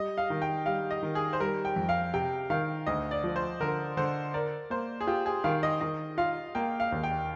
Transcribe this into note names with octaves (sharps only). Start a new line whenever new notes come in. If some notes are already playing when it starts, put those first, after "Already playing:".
Already playing: G3 D#5
F5
D#3
G5
G3 F5
D#5
D#3
G#4
C5
G3 A#4
G5
F2
F5
C3 G5
D#3 F5
D2 D#5
D5
F3
C5
D3 A#4
D3 C5
A#4 D5
A#3 C5
G#4
F4 G4
G#4
D#3 F5
D#5
D#3 D#5
F4 F5
A#3 G5
F5
D#2
G5